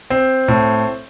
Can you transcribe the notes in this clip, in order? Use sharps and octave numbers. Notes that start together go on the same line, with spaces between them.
C4
A2